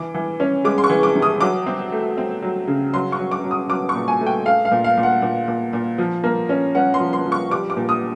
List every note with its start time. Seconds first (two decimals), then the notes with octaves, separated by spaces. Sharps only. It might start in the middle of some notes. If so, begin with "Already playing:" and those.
Already playing: E3 D6
0.14 E3
0.40 C#4
0.65 G#3 D6
0.78 C6
0.84 C#6
0.89 E3
1.03 D6
1.15 C3
1.22 D#6
1.41 F#3 D6
1.66 C4
1.92 A3
2.18 C4
2.42 F#3
2.68 C#3
2.94 F#3 C6
3.12 C#6
3.19 F#3
3.31 D6
3.44 F#3
3.51 D#6
3.69 F#3 D6
3.89 C#6
3.95 A#2
4.08 G#5
4.21 A3
4.26 G5
4.46 A3 F5
4.65 F5
4.71 A#2
4.84 F5
4.97 A#2
5.03 F#5
5.22 A#2
5.48 A#2
5.73 A#2
5.98 F3
6.24 A#3
6.49 C#4
6.75 C#4 F#5
6.94 C6
7.00 F3
7.13 C6
7.25 F3
7.32 C#6
7.50 G3 D6
7.70 D6
7.77 A#2
7.89 D#6